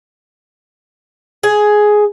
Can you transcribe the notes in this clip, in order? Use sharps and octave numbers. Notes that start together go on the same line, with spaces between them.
G#4